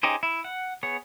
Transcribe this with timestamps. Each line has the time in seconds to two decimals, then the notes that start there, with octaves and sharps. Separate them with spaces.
0.03 C#4 D#4 G4 G#4 C5
0.23 E4
0.44 F#5
0.83 B3 G#4 C#5